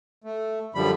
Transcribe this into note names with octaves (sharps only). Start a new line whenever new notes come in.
A3
F#2 D3 F3 G3 B5